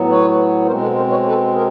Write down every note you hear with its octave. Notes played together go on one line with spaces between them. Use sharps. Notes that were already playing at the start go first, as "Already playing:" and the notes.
Already playing: A2 F#3 B3
B4 C#5
B2 G#3 C4 A#4 C5
A4 B4
A#4 C5
B4 C#5
A4 B4
G#4 A#4